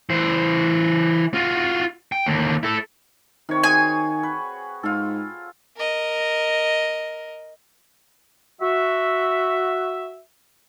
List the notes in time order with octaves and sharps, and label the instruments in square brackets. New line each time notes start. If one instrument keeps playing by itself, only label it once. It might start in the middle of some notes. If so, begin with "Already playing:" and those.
[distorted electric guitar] E3 C5
F4 F#4
G5
D#2 D3
E4 A4
[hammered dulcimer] C3 C#5 [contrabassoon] D#3
[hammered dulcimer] F#4 G#4 C#5 [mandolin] G#5
[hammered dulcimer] B4
[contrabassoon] G#2 [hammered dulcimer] F4 A4
[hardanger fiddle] A#4 D#5
[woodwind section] F#4 E5